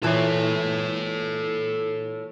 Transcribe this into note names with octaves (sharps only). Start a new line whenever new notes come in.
A#2 E3 A4 C#5